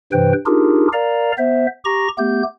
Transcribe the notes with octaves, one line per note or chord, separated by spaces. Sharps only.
G2 C3 E3 B4 C5 G5
D4 D#4 F4 G4 G#4 A#4
A#4 D5 F5 A#5
B3 C5 E5
G4 A#5 C#6 A#6
A3 B3 G4 G6